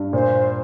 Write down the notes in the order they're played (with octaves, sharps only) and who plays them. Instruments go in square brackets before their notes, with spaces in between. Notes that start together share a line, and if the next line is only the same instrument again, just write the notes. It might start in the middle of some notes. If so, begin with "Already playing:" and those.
Already playing: [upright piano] G2
[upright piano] A#2 [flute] C5